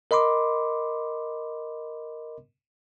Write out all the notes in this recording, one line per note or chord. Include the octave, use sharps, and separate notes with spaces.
A#4 D#5 B5 C6 D6